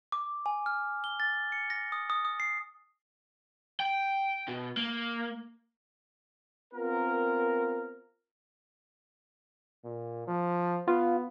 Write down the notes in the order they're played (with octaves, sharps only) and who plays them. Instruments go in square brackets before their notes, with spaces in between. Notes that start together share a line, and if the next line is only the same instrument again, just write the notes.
[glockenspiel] D6
G#5
F6
G7
A6
C#7
A#6
D#6
D#6
D#6
C7
[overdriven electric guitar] G5
B2
A#3
[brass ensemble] B3 C4 F4 A#4
[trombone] A#2
F3
[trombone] B3 [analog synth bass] F4